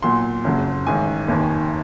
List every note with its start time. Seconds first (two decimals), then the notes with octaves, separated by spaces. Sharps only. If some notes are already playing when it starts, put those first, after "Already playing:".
0.02 B1 A#2 F#3 C6
0.44 F#1 F2 C#3 F#3
0.86 A1 G#2 D#3 G#5
1.28 F1 D#2 D#3